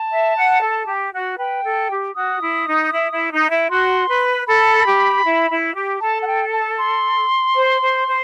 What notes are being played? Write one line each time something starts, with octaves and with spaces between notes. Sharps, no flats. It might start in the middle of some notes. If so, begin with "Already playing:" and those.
Already playing: A5
E5
F#5
A4
G4
F#4
B4 G5
A4
G4
F#4 D#6
E4
D#4
E4
E4
D#4
E4
F#4 C6
B4
A4 B5
G4
E4
E4
G4
A4 A5
F#5
G5
A5
C6
C5
C5
C5